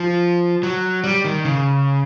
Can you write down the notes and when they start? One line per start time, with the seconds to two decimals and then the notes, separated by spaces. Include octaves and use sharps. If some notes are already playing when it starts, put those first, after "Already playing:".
Already playing: F3
0.63 F#3
1.04 G3
1.25 D#3
1.45 C#3